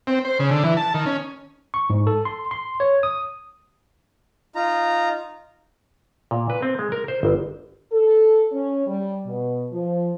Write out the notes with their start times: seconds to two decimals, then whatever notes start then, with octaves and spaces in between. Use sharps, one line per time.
0.07 C4
0.25 C5
0.39 C#3
0.51 D3
0.64 E3
0.77 A5
0.94 D#3
1.06 C#4
1.74 C#6
1.90 G#2
2.07 A4
2.25 C6
2.51 C6
2.80 C#5
3.03 D#6
4.55 D#4 F4 A#5
6.31 A#2
6.50 B4
6.62 C4
6.79 G#3
6.92 A#4
7.08 C5
7.23 G1
7.92 A4
8.52 C#4
8.87 G3
9.26 B2
9.72 F3